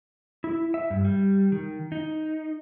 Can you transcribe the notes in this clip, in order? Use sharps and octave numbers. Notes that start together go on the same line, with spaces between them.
E4
E5
G2
G3
D#3
D#4